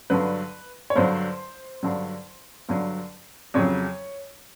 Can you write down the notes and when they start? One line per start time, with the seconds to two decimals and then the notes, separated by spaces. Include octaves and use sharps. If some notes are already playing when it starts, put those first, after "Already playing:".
0.10 G2 D3 F#3 B4
0.90 C#5
0.96 G2 D3 F#3 C5
1.83 G2 D3 F#3
2.69 G2 D3 F#3
3.54 F2 C#3 F#3 C#5